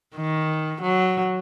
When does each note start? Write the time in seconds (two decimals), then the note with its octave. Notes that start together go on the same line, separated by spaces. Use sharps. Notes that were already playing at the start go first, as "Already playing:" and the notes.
0.16 D#3
0.82 F#3